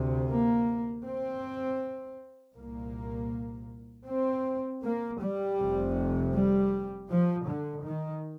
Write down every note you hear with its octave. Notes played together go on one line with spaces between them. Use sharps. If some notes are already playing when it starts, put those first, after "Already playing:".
Already playing: D2 C3
A#3
C4
C2 A#2 A#3
C4
A#3
G3
F1 F2 C3
G3
F3
D3
D#3